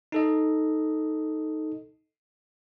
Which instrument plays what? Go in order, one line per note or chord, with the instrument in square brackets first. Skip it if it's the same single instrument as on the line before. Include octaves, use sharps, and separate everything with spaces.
[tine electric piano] D#4 A4 D#5